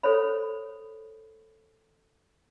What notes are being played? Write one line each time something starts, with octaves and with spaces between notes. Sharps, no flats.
A4 C5 C#5 B5